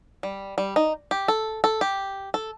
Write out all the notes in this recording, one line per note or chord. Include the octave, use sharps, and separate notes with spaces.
G3
G3
D#4
G4
A4
A4
G4
A4